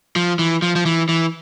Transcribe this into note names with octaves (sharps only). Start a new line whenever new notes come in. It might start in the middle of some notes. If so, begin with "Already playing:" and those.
F3
E3
F3
F3
E3
E3